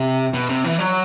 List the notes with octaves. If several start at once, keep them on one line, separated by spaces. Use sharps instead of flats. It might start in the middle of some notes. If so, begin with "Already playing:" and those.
Already playing: C3
B2
C3
E3
F#3